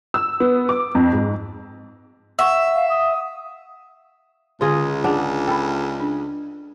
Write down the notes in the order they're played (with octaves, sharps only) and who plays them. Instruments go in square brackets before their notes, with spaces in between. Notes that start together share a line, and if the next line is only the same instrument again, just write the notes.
[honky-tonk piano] E6
B3
D6
F2
G#2
[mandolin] E5 [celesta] F#5 C#6
[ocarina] F5
D#6
[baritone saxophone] C#2 [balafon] D3 [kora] F4 G#4 D#5
[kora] D4 [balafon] G#4 F#5
[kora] A4 [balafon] G5 B5
[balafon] D4